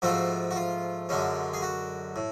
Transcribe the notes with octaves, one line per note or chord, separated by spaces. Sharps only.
G#2 F3 A3 F4 F#4
F#4
F4
F#2 D3 G#3 C#4
G#4
F#4
A2